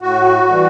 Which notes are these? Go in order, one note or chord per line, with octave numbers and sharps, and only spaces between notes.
A2 F#4
E3 G3